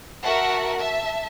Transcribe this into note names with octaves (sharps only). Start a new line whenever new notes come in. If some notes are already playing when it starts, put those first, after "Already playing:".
F#4 A#4 E5 F#5 A5
E5 A5